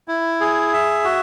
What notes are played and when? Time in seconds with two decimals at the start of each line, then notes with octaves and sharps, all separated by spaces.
0.08 E4
0.41 G#4
0.73 E5
1.05 F#4